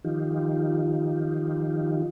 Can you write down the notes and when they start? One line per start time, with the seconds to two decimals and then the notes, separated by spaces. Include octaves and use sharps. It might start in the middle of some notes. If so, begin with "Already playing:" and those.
0.04 D#3 F3 D#4 F4 G4